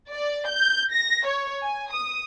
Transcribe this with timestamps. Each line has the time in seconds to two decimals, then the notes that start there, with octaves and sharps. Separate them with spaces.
0.10 D5
0.48 G6
0.93 A#6
1.27 C#5
1.63 G#5
1.93 D#6